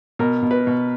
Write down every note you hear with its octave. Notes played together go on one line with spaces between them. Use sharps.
B2 A#4
B2
B4
B2